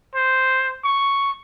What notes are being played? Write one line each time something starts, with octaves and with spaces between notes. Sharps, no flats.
C5
C#6